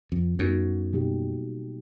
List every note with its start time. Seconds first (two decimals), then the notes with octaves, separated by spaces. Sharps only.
0.12 F2
0.39 F#2 G3 B3 D#4 F#4
0.93 B2 F#3 A#3 D#4 G4